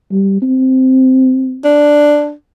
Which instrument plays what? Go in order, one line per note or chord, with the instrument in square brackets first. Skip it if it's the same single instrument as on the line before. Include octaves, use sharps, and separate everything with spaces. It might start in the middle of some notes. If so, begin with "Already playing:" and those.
[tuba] G3
C4
[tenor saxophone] D4